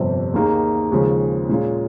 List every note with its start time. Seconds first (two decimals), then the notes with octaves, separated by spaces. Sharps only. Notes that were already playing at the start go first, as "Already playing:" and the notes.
Already playing: G1 F2 C3 G3 C4
0.34 D#2 D#3 A#3 D#4 G#4
0.92 D#2 C#3 F3 G#3
1.49 A#2 G#3 C#4 F4